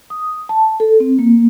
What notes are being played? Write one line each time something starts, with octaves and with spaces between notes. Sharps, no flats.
D#6
A5
A4
C4
A#3